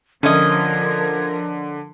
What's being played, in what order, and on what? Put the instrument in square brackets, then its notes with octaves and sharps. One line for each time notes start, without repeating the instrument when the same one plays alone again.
[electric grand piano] D3 [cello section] F3 A#4 [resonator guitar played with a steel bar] C#4 D#5 [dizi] G#6